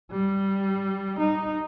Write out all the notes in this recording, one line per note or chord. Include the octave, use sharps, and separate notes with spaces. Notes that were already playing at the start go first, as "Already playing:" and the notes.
G3
D#4